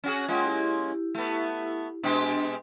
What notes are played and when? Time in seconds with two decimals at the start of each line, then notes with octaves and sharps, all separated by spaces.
0.04 C#4 F#4 G#4
0.28 G#3 A#3 C#4 F4 F#5 G5
0.45 E4 G4
1.15 A3 B3
2.03 B2 G#3 D4 G4